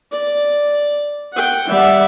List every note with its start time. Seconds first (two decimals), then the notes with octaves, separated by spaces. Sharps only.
0.12 D5
1.33 F#5 G5
1.68 G3 D5 E5 F#5